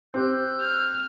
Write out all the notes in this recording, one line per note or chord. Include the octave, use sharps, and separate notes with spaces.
C4 G4 C5 E6 F#6 G6
F6